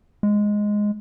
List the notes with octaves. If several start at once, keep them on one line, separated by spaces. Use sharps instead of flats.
G#3